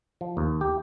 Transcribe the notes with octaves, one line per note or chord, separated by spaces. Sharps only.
F3
D#2
G4